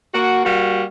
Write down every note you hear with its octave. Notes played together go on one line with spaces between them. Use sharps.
A#3 F#4
G3 A#3 F#4